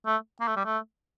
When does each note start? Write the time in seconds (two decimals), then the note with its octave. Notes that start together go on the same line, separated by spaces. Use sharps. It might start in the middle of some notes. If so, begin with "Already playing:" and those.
0.06 A3
0.40 A#3
0.48 A3
0.56 G3
0.65 A3